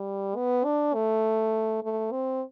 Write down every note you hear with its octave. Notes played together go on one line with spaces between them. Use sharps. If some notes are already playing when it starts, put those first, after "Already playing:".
Already playing: G3
B3
D4
A3
A3
C4